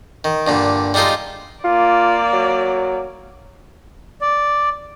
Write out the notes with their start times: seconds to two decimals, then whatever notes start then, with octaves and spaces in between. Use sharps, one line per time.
0.24 D#3
0.47 G2 A#2 D3
0.94 G3 G#3 D#4 F4 A4
1.64 A#3 F4 D5
2.33 F#3
4.21 D5